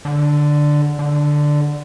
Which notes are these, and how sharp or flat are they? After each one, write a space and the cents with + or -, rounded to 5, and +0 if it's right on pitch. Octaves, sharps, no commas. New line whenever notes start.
D3 +5
D3 +5